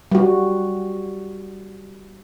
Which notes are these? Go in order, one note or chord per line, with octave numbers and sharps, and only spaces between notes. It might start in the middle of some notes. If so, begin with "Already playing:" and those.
G3 F#4